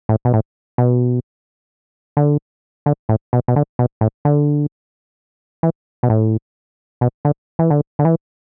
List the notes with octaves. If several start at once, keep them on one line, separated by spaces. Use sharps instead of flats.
A2
B2
A2
B2
D3
D3
A2
B2
B2
D3
B2
A2
D3
E3
B2
A2
B2
D3
E3
D3
D3
E3